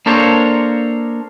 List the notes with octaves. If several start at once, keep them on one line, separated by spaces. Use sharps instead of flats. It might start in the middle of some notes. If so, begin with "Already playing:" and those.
A#3 D4 A4 A#4 C5 C#5